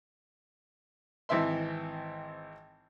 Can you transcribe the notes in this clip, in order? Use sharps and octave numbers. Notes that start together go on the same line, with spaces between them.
G#1 E3 C4 E5 C6